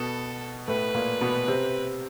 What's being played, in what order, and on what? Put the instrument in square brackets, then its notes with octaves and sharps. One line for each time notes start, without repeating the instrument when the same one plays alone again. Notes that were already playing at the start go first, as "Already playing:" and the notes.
Already playing: [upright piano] B2 B3 [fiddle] A4
[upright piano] A2 A3 [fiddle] B4
[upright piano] A#2 A#3
B2 B3
C3 C4